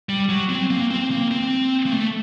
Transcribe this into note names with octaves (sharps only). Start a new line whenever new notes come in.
G3
F#3
C4
A#3
C4
A#3
C4
A#3
A3